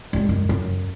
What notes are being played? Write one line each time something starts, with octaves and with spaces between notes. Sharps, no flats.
G3 G#3
F#2
F#2